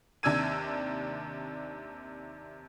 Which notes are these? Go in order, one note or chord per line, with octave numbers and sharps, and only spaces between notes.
D#2 C3 D4 E6 G#6 D#7